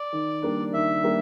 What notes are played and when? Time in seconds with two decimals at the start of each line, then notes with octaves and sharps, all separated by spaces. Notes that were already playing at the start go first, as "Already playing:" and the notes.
Already playing: D5
0.13 D#3
0.42 G3 A#3 D4
0.74 D#3 E5
1.03 G3 A#3 D4